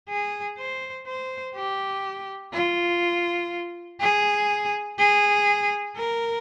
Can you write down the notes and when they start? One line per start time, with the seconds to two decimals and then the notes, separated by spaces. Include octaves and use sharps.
0.09 G#4
0.58 C5
1.07 C5
1.56 G4
2.53 F4
4.00 G#4
4.98 G#4
5.96 A#4